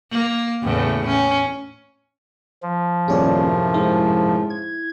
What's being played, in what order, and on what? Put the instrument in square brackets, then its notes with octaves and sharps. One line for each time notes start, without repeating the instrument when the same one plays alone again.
[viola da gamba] A#3
E2 A2 C#3
C#4
[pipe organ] F3
[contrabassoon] D#1 [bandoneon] F#2 A2 C3 [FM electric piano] G#4 C#5 D5
[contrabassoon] G#2 [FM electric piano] E4
[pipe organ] G#6